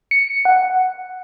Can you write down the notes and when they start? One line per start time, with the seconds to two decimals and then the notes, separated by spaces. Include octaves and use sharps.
0.11 C#7
0.45 F#5